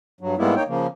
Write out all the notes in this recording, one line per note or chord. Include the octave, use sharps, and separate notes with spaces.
G2 F#3
G#2 G3 G#3 A#3 B3 E4
A#3 D#4 C#5 G5
C#3 F3 A#3